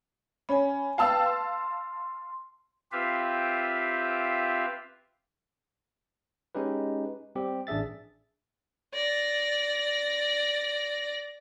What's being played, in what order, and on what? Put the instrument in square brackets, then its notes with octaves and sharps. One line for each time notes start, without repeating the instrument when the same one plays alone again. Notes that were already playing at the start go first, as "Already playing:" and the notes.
[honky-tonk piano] C#4 [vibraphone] G#5 B5
[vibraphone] B4 G5 [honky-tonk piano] F5 A5 E6
[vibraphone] C6
[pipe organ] C4 F4 G4 B4 E5 F5
[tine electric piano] G#3 C#4 D#4 G4 B4
G3 C4 G4
A1 D4 G#4 E5 A6
[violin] D5 A#6